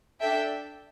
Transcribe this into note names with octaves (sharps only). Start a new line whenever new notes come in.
D4 A4 E5 G5